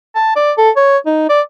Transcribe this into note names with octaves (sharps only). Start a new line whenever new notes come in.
A5
D5
A4
C#5
D#4
D5